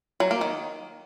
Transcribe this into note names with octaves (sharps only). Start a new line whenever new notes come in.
F#3
A#3
D#3